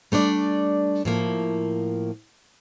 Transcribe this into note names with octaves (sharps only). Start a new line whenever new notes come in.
G3 A3 D4 D5
A2 F3 A#3